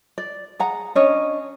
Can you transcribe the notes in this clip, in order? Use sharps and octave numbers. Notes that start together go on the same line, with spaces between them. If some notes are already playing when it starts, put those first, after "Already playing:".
D5
G#4 F#5 A#5
C#4 D4 C#5 D#5